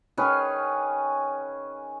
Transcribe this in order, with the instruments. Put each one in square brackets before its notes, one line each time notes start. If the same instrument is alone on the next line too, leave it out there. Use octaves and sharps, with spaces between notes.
[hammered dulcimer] D#3 C#4 G#4 B4